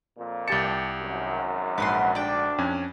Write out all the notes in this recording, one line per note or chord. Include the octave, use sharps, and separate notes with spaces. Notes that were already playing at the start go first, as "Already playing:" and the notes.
F2 A#2
C2 G4 G5 A5 C#7
G#1 F#2
A#1 G#2 B4 F#5 C6
D2 D4 D5 G5
F2 C#4 G#5